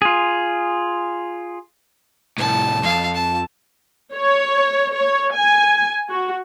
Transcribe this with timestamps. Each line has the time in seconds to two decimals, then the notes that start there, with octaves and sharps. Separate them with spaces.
0.02 F4 G#4
2.38 C2 A2 A5
2.83 F2 F5 A5
3.14 A5
4.14 C#5
4.93 C#5
5.34 G#5
6.09 F#4